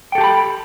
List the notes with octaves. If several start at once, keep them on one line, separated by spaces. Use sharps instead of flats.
G4 A4 G5 A5 B5